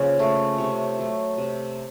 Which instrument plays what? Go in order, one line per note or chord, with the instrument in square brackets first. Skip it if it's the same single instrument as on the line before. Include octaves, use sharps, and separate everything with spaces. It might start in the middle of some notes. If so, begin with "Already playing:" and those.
Already playing: [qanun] C#3 F3 A#3
A3
C3 C#5
F#3 A3
C3